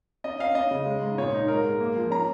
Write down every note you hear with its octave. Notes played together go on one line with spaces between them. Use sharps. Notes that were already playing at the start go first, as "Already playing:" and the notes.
C#4 D#5
C#4 F5
C#4 D#5
C#3
G#3
G#2
A#2 C#5
D#4
G#2 A#4
G#3
A#3
F3
C#4 A#5